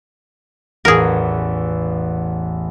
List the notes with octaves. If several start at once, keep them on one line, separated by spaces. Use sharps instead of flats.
A1 E2 G#4 A#4